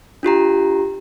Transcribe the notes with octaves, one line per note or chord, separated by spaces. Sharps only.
D4 F4 G4 A#5